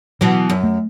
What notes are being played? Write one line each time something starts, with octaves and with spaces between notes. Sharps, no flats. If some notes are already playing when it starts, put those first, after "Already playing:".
B2 E3 F#3
F#2
A3